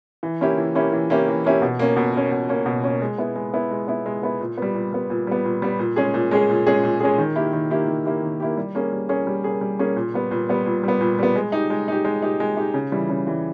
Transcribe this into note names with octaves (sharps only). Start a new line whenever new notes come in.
E3
A#3 C#4 E4 G4
E3
A#3 C#4 E4 G4
E3
A#3 C#4 E4 G4
E3
A#3 C#4 E4 G4
B2
A#3 C#4
B2
A#3 C#4
B2
A#3 C#4
B2
A#3 C#4
G#3
B3 E4
G#3
B3 E4
G#3
B3 E4
G#3
B3 E4
A#2
G3 B3
A#2
G3 B3
A#2
G3 B3
A#2
G3 B3
A#2
G#3 C#4 G#4
A#2
G#3 C#4 G#4
A#2
G#3 C#4 G#4
A#2
G#3 C#4 G#4
D#3
A#3 E4 G4
D#3
A#3 E4 G4
D#3
A#3 E4 G4
D#3
A#3 E4 G4
G3
A#3 C#4 G#4
G3
A#3 C#4 G#4
G3
A#3 C#4 G#4
G3
A#3 C#4 G#4
A#2
G3 B3
A#2
G3 B3
A#2
G3 B3
A#2
G3 B3
G#3
D#4 G4
G#3
D#4 G4
G#3
D#4 G4
G#3
D#4 G4
C#3
E3 G3
C#3
E3 G3